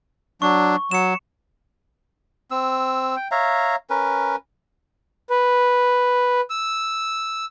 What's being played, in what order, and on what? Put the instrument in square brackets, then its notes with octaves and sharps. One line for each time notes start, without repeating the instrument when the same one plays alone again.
[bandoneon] F#3 D4 [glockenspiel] C#6
[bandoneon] F#3 [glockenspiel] C#7 E7
[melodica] C4 E6
G5
C#5 E5 F5 A#5
C#4 A#4 B4
[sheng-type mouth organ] B4
E6